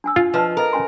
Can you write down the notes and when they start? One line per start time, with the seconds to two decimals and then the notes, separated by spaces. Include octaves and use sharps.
0.04 D4 G#5 E6
0.16 D4 F4
0.34 F3 B4 D#5 A5
0.57 A4 A#4 D#5
0.73 C#4 G#5 C6